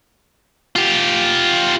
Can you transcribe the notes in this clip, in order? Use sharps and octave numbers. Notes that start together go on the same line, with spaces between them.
F4 G4